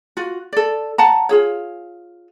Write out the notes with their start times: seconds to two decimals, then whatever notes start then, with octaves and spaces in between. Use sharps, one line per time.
0.17 F4 F#4
0.53 A4 D5
0.98 F#5 A5 A#5
1.29 F4 G#4 C#5